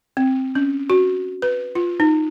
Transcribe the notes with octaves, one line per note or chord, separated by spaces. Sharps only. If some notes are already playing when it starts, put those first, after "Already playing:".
C4
C#4
F#4
B4
F4
D#4